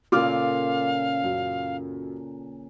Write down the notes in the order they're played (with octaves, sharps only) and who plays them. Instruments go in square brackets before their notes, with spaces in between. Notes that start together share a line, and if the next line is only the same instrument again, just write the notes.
[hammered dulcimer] A#2 C#3 A4 [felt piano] F4 D6 F6 [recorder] F5
[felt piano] F#2